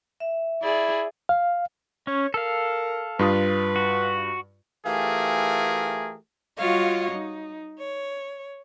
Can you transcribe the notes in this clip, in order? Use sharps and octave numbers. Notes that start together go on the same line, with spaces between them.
E5
E4 G#4 D5
F5
C#4 C#5
A4 A#4 F5
G2 F4 B4 D#6
F#4
E3 A3 F4 G4 G#4 A#4
G3 F4 F#4 C#5 D#5 F5
D#4
C#5